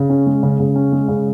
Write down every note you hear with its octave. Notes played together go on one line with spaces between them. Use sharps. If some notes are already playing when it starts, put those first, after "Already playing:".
Already playing: C#3
C#4
G#3
C#3
C#3
C#4
G#3
C#3